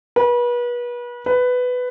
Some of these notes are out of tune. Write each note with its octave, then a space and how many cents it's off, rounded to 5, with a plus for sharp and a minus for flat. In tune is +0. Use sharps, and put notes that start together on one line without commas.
B4 -35
B4 +10